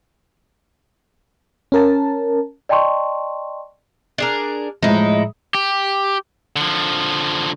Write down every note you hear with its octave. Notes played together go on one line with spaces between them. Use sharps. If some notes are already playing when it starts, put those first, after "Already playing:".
C#4 A#4 A5
D5 D#5 G5 A5 C6 C#6
D4 G#4 A#4
A2 F3 G#3 D#4 E4
G4
D3 F3